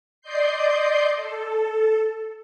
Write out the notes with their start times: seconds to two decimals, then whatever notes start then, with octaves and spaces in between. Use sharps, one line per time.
0.21 D5 D#5 C6 G6 C7
1.16 A4